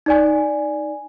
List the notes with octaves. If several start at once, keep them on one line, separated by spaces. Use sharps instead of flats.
D#4 D5 G#5